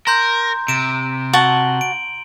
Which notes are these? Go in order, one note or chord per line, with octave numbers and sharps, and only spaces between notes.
A#4 A#5 C6 G6
C3 D7 E7
F#4 A5 F#7 G7
D7